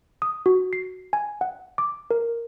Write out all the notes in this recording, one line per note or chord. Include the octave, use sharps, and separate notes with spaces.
D#6
F#4
C7
G#5
F#5
D6
A#4